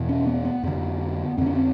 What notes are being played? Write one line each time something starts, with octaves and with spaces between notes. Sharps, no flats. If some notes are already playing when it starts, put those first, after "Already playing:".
Already playing: E2 B2
C#4
B3
B3
F2 D3 B3
F2 D3 C4
C#4
C4